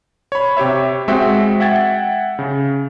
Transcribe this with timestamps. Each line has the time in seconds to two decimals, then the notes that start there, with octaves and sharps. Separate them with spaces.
0.32 C#5 B5
0.57 C3 G4 C#5 E5
1.08 G#3 C4 F#4 E5 G5
1.60 E5 F#5 G5 G#6 A6
2.39 C#3